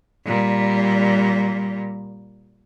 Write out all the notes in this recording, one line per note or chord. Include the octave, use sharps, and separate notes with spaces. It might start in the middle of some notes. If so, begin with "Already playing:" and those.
A#2 G3